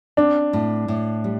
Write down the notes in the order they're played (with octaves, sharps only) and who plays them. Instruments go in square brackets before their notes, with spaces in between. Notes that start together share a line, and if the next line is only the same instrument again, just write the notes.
[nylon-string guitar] C4 [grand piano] D4
[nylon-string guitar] A2
A2
G3